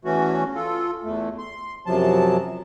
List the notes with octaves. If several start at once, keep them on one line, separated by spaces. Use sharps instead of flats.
E2 E3 A3 C#4 F#4
F4 A4
E2 A3
C6
F#2 C3 F3 F#3 A5